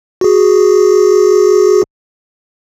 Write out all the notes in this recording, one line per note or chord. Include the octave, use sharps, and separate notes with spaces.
F#4 G#4